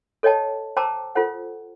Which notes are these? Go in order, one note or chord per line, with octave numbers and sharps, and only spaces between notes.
A4 C#5 D#5 G5 A5
C5 G5 A5 A#5 D6 E6
F4 A4 C5 F#5